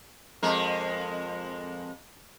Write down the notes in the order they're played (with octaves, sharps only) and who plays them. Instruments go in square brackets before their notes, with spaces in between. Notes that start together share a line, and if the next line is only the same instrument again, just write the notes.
[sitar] F2 G#3 A#4